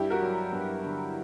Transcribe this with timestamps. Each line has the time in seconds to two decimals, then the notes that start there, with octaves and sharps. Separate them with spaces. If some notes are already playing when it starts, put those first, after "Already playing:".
Already playing: G2 E4 G4
0.10 F#4 A#4
0.22 F#3
0.53 G2
0.85 D3